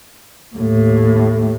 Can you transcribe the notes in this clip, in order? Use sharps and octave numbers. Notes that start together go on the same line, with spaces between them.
D#2 A2